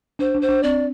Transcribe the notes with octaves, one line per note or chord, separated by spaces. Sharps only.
D4 C5
D4
C5
D4
C4 D5